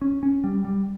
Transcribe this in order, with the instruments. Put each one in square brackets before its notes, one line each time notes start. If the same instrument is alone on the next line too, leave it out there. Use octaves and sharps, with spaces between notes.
[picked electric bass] C#4
C#4
G3
G3